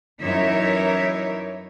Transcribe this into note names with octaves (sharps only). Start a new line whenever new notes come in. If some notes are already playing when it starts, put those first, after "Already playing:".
F#2 E3 D#4 A#4 C#5 E5